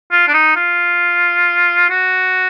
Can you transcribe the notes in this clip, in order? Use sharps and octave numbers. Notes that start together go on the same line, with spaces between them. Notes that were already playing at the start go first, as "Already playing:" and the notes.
F4
D4
D#4
F4
F#4